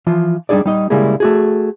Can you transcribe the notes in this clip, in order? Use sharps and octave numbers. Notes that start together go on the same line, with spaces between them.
E3 F3 F4
G3 D4 D#4 G#4 D5
G3 D#4 D#5
C#3 G3 G#3 A#3 E4 G#4
A3 F#4 G#4